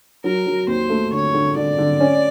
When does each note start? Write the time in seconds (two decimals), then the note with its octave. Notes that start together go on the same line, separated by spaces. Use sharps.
0.24 F#3 A#4
0.46 F#3
0.67 D#2 C5
0.90 A3
1.12 D3 C#5
1.34 D3
1.56 D3 D5
1.78 D3
2.00 C#4